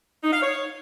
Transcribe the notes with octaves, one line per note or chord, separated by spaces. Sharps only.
D#4
F5
C#5